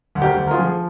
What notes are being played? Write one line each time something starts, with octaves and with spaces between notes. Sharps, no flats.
D2
G4 A#4
D2
A#4
F4 G#4
F3